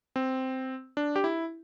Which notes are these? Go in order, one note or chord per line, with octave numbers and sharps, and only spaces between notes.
C4
D4
G4
E4